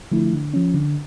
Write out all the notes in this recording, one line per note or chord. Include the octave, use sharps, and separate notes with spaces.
D3 F3 A3 E4
D3
F3 C#4
D3